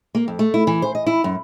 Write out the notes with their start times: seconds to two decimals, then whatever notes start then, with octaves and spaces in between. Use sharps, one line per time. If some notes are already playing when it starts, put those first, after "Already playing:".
0.15 A#3
0.28 F2
0.39 A3
0.54 E4
0.67 E3
0.82 C5
0.95 D#5
1.07 E4
1.24 F#2